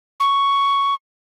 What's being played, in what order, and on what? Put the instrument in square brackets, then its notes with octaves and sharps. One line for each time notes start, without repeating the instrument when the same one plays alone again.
[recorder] C#6